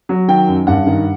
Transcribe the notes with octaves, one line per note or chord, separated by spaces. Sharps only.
F#3
D#3 G5
F#2
G2 F#5
D#3